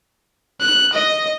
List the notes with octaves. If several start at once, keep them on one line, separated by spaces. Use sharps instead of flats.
F#6
D#5